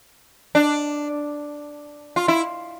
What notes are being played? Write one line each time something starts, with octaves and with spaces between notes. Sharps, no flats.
D4
F4
E4